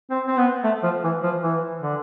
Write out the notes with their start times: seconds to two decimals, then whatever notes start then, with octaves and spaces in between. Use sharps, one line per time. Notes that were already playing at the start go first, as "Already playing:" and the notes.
0.11 C4
0.27 C4
0.37 B3
0.64 A3
0.83 F3
1.04 E3
1.23 F3
1.42 E3
1.82 D3